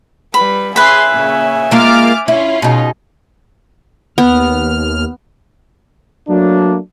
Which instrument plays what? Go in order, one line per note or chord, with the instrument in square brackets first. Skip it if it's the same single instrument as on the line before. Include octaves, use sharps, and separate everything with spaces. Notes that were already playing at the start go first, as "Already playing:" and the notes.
[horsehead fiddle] G3 B4 [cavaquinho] B5
[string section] C#4 G#4 C6 [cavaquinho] B4 B5 [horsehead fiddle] E5 G#5
[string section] A#2 C#3
[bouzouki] G#3 A#3 F4 [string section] D6 F6 A6
[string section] C#4 F4 [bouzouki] E4
[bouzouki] B2 D#4 [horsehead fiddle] G#4
[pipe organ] D#2 F6 [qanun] B3
[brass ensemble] F#3 A3 A#3 D4